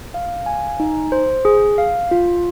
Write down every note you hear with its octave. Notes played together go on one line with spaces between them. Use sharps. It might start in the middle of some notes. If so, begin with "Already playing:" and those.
F5
G#5
D#4
C5
G#4
F5
F4